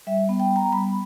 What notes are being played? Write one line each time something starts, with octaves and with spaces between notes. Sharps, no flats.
G3 E5
B3
G5
B3
A#5
G3 B5